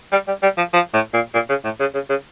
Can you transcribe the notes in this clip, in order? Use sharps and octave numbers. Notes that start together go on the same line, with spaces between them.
G3
G3
G3
F3
F3
A2
A#2
A#2
C#3
A2
C#3
C#3
C#3